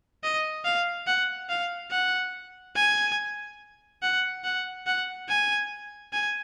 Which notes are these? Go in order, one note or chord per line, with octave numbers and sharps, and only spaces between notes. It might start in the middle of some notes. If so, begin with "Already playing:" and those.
D#5
F5
F#5
F5
F#5
G#5
F#5
F#5
F#5
G#5
G#5